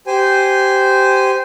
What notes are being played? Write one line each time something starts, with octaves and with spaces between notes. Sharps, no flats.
G4 C5 G#5